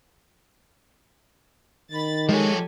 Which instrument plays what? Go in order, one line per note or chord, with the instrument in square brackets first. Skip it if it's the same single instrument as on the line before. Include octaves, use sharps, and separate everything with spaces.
[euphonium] D#3 [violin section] B5 A6
[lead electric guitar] F3 C#5 [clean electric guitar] G#3 [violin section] G4 A4 G#5